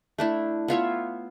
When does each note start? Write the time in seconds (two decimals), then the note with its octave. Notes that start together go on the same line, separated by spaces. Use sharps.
0.18 A3 D4 E4
0.68 B3 F4 C#5 E5